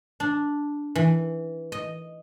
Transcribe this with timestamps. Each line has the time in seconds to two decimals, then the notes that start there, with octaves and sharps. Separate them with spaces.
0.20 D4
0.95 E3
1.72 D#5